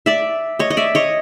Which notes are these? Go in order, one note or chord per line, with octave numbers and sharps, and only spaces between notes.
D5 E5
C#5 D#5
D#5
D5 E5
C#5 D#5